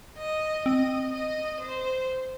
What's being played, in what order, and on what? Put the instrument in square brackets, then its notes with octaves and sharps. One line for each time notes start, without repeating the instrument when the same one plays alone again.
[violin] D#5
[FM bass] C4 [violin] D#5
[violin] D#5
C5